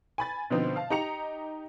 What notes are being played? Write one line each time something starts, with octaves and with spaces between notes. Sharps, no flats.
G#5 B5 A6
B2 D3 F3 B3 C4 D#4
F5 A5
D#4 G4 A#5 C#7 F7